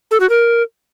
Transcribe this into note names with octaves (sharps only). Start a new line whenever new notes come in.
A4
F#4
A#4